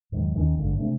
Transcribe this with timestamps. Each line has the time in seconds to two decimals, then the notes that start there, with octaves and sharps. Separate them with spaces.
0.12 E2 G#2 D#3 F#3
0.35 D#2 D#3 C4 C#4
0.58 G#1 G2 D3
0.76 C3 A3 D4